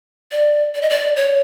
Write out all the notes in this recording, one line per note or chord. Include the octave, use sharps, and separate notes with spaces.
D5
D5
D#5
D5
C#5